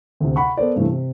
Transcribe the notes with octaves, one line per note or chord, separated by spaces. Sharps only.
D2 C3
F#5 B5 C#6
B3 A4 A#4 C5 D5
G2 C3 E3 A3
C3